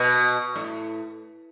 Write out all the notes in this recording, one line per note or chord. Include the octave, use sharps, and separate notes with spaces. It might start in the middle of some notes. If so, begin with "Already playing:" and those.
Already playing: B2
A2